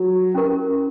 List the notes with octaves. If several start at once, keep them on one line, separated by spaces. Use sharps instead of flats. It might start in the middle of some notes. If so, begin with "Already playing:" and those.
Already playing: F#3
C#4 E4 G4 A#4